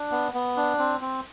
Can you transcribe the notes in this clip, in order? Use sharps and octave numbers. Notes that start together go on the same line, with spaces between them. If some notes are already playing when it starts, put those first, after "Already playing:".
Already playing: D4
B3
B3
D4
C4
C4